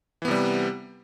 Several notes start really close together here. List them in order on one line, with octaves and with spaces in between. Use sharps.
E3 B3 C3 G3